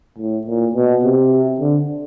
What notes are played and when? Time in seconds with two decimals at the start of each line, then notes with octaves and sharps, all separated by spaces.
0.18 A2
0.47 A#2
0.75 B2
1.04 C3
1.60 D3